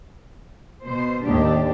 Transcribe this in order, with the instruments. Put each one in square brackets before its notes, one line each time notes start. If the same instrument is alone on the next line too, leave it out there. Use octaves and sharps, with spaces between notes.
[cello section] B2 C5
[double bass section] D#2 A2 D#3 [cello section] D4 G4